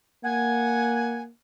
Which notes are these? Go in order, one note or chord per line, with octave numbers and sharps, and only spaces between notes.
A#3 F#5 G#5